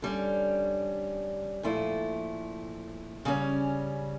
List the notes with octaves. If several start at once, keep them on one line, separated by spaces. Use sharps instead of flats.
D3 G3 C#4
A#2 F3 A3 E4
C#3 G3 C#4